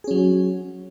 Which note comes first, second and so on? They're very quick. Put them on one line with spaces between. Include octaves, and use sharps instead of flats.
G#4 C#4 F#3